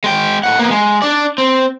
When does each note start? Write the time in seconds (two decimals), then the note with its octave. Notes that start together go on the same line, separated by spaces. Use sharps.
0.04 G#3 G5
0.43 A2 F#5
0.59 A#3 B3
0.71 G#3
1.02 D4 D5
1.38 C4